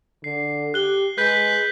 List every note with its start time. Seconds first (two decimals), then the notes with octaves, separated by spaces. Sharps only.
0.24 D3 C7
0.74 G4 F#6 G7
1.18 G#3 B4 G6 B6